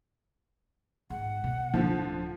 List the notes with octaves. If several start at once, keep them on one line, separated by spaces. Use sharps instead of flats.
G#2 F#5
B2
D1 D3 F3 A3